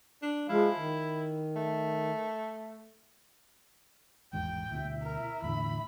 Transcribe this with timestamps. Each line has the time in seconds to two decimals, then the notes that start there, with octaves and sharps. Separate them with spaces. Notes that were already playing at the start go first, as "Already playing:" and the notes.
0.22 D4
0.49 F3 G#3 E4 F5
0.76 D#3
1.56 A3
4.33 G#1 E2 G#2 G5
4.71 D2 B2 E4 E5
5.03 A#4
5.42 E2 A2 D3 B5